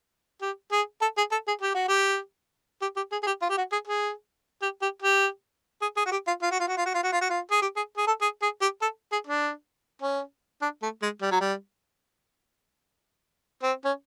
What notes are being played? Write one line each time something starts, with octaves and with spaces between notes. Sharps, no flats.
G4
G#4
A4
G#4
A4
G#4
G4
F#4
G4
G4
G4
G#4
G#4
G4
F4
G4
F#4
G#4
G#4
G4
G4
G4
G#4
G#4
F#4
G4
F4
F4
F#4
F4
F#4
F4
F#4
F4
F#4
F4
F#4
F4
G#4
G4
G#4
G#4
A4
G#4
G#4
G4
A4
G#4
D4
C#4
D4
A3
G#3
G3
F#3
G3
C4
C#4